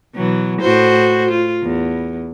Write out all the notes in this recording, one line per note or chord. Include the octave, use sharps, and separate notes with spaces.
B2 E3 F#3
A2 F#4 C5
F4
E2